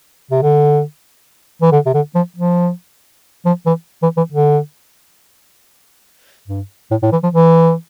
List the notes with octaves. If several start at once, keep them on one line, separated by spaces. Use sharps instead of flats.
C3
D3
E3
D3
C3
D3
F3
F3
F3
E3
E3
E3
D3
G2
A2
A2
E3
F3
E3